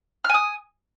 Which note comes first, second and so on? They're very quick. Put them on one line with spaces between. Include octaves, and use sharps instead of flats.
F6 G#5 D#6